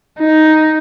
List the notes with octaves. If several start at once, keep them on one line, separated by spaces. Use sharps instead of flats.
D#4